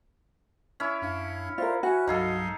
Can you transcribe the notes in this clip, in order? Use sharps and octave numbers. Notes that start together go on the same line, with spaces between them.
C#4 E4
F#2 D4 F5
F4 A#4 C5 D5 E5
F#4 C5 E5 G#5 F#6
C2 G2 F#3 D#4 G#4 A4 F5